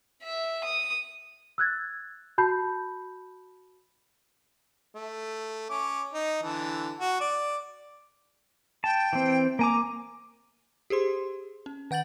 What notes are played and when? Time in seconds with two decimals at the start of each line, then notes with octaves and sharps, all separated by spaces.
0.23 E5
0.64 D#6
1.58 E6 F#6 G#6 A6
2.38 F#4 A5 B5 G6 C7
4.95 A3
5.70 C#4 D6
6.14 D#4
6.42 D3 E3 A5
7.00 F#4
7.21 D5 D6
8.84 G5 A5
9.13 E3 C4
9.59 A#3 G#5 A#5 D6
10.90 G4 G#4 C5 C6
11.66 C#4
11.91 D#3 F#5 G6 A6 F#7